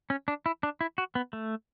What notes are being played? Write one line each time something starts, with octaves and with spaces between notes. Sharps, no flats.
C#4
D4
E4
D4
E4
F#4
B3
A3